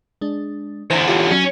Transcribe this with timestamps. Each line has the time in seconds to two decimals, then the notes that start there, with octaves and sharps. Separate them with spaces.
0.21 G#3 D4
0.90 E2 D3 C5
1.07 F4 G4 C#5
1.31 F#3 C#4